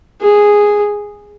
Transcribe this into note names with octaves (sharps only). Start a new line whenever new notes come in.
G#4